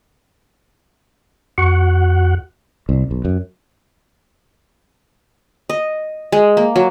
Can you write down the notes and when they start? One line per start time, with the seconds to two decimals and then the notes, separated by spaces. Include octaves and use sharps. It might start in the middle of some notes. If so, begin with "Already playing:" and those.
1.58 F2 F#4 F#5
2.89 C2
3.11 B1
3.25 F#2
5.69 D#5
6.32 G#3
6.57 A#3
6.76 F#3